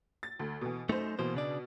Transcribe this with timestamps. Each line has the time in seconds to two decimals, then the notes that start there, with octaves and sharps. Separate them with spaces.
0.23 A6
0.39 D2
0.61 B2 E3
0.89 F#2 A3 D#4 C5
1.19 B2 E3 A#3 C5
1.35 C#3 D4 D5